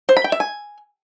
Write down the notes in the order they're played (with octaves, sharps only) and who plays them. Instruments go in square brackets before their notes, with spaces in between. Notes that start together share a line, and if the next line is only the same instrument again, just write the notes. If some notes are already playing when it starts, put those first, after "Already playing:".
[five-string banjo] C5
B5
G5
E5
G#5